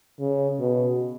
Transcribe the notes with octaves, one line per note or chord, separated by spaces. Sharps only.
C#3
B2